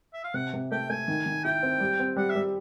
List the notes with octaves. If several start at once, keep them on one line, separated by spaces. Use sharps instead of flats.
E5
F5
C3 F#5
C3
A3 G5
A3 G#5
D#3
D#3
E4 G5
C4
G3
C4
G3 F#5
E5
G3